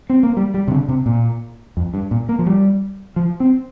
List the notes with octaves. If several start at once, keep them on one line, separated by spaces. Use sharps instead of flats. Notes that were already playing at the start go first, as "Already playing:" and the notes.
C4
A#3
G3
G3
C3
D3
C3
A#2
F2
G2
A#2
A#3
F3
G3
F3
C4